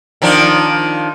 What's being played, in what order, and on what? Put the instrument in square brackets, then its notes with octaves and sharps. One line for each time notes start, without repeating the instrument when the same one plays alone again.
[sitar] D#3 F3 D4